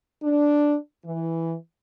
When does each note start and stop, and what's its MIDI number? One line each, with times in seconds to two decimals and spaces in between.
0.22 0.76 62
1.05 1.54 52